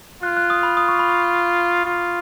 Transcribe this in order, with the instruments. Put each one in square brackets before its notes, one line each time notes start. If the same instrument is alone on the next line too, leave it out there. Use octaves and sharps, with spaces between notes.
[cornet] F4 [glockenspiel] F#6
[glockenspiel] F#6
D#6
B5
D#6
C#6
B5
C#6
[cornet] F4